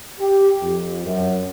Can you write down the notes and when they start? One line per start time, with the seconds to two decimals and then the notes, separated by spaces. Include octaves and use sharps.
0.19 G4
0.61 F2
1.05 F#2